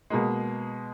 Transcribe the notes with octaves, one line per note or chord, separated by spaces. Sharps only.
B2 G#3 A#3